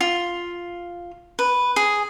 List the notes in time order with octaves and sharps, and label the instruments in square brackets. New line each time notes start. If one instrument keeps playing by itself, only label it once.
[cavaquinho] F4
B4
G#4